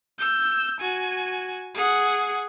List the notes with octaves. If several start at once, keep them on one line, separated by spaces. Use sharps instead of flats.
E6 G6
F#4 G#5
G#4 F#5